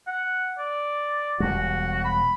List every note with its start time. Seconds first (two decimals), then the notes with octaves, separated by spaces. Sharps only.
0.07 F#5
0.58 D5
1.40 E1 G3 F#4
2.05 B5